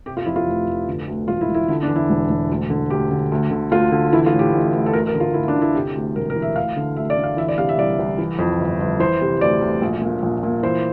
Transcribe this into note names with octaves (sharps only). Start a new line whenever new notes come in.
C3 G4
F4
F2 E4
F4
F1
F1
D3
D2
E1 F4
E4
E1
E4
D3 E4
D4
E2
E4
E1
E1
D2
D3
D2 G4
D3
D2
D3
D2 F4
D3
E3 E4
F4
A2
G4
A1
A1
A4
D2 A#4
A#4
D3
F4
D2 E4
D4
D3
E4
C3 G4
D2
E1 A#4
A#4
E3
E5
D2 F5
D3
D2 E5
D5
D3
F5
E3 E5
D5
C3 F5
E5
C2 D5
C2
E3
F2
G1
G1
E3 C5
C3
D2 D5
D2
A#1
A#2
A#1
A#2
E3 C5